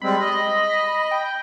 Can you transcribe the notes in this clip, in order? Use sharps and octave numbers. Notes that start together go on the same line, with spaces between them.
G3 G#3 C4 B5
D#5 B5
G5